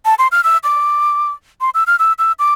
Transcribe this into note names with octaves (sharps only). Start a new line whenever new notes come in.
A5
C6
F6
E6
D6
C6
E6
F6
E6
E6
D6